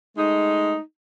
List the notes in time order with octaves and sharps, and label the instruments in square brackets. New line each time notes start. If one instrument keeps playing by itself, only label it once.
[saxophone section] G#3 A3 D#4